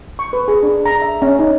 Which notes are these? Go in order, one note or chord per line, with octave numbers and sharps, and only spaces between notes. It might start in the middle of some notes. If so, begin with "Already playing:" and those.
C#6
B4
G#4
D4
A#5
E5
C#4
D#4